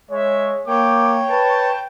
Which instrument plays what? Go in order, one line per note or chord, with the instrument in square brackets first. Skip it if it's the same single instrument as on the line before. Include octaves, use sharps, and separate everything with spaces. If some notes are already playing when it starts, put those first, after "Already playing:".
[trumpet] G#3 [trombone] C#5 [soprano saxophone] E5
[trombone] A#3 [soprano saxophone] C#5 [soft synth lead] G5 [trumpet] D6
[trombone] B4 [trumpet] A5